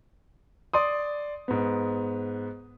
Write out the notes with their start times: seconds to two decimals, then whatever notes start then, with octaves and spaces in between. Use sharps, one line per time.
0.73 D5 C6 D#6
1.48 G#2 B3